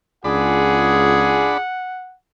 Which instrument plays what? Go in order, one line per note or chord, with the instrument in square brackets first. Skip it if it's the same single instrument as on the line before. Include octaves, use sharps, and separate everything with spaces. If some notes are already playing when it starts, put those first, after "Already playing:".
[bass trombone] C#2 [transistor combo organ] D4 B5 [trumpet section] F4 G#4 [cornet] F#5